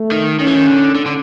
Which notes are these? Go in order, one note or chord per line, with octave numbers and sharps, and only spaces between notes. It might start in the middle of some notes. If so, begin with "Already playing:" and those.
Already playing: A3
D#3
D#3 C#4
E3
D#3
D3
D3
D3